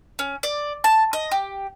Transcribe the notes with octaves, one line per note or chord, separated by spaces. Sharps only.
C#4
D5
A5
D#5
G4